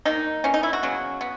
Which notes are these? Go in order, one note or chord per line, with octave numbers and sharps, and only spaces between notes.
D#3 A#3 D#4
E3 A#3 C#4
D#4
E4
F#4
C#3 F#3 B3
B3